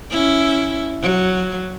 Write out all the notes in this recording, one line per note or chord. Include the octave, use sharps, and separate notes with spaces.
C#4 E4
F#3